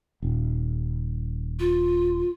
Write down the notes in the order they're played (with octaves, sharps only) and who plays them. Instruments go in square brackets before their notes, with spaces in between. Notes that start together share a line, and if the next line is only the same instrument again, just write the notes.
[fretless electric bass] D#1
[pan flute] F4